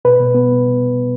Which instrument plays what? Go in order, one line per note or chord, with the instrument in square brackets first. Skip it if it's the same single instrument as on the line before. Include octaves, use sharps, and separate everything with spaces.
[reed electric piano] B2 B4
B2
B3